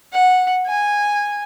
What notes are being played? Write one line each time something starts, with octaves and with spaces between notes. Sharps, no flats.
F#5
G#5